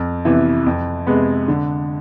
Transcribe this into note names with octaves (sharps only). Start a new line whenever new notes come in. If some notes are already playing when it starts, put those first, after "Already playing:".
Already playing: F2
C3 E3 B3
F2
C3 G#3 B3
D3